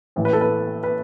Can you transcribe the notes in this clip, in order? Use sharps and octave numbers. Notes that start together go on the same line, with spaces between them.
A1 A2 E3
B4
A4
B4
B4